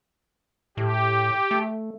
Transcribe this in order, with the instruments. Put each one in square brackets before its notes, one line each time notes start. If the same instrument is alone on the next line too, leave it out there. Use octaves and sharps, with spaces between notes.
[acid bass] A2 [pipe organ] G4
[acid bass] A3